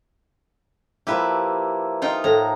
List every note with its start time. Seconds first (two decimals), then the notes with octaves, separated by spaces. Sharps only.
1.07 F3 A#3 E4 G4 B4 E5
2.02 D#4 F4 G5
2.24 A2 A#5